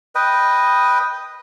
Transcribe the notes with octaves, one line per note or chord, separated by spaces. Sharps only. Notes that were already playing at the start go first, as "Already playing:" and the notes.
B4 D#5 G5